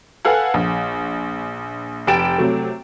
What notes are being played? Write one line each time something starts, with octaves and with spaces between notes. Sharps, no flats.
A4 B4 F5 F#5 G#5
A#1
F1 G4 A6 D7 E7
C3 F#3 A3